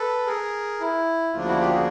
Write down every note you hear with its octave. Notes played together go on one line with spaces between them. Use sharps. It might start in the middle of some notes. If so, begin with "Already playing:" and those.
Already playing: A4 B4
G#4 A#4
E4
D2 C#3 F3 A#3 D4 F4
E4 F#4
F4 G4
F#4 G#4